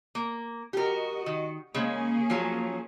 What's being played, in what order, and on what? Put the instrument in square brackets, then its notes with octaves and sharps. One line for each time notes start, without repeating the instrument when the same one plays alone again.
[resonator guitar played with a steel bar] A#3
[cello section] F#4 D#5 [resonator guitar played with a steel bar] G4 A#4
[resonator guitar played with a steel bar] D#3
[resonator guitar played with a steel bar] C#3 G#3 [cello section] A#3 C#4 G#4
[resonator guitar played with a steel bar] F3 F#3